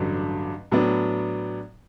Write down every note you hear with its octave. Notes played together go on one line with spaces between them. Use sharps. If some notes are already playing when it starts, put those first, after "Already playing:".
Already playing: A1 G2 D3 F#3
A2 F#3 B3 D4